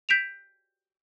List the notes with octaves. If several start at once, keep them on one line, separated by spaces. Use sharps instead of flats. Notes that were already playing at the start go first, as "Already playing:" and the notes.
G6 B6 D7 E7 F7